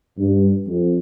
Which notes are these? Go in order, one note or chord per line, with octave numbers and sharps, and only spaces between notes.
G2
F2